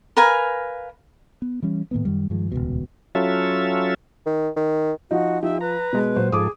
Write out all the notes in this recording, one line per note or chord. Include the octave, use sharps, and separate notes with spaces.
A#4 B4 F5 G#5
B3
E3 G3 C#4
A2 D#3 A#3 B3
F#2 D#3 G3
G2 D#3 F3 G#3
D#1 G#1 C#2 B2
F#3 C#4 F4 A4 E5
D#3
D#3
F3 D#4 F#4
F3 D#4 G4 E5
B4 A#5
B2 G#3
A#2 F#3 C5
G#2 F3 G#4 A4 D6 D#6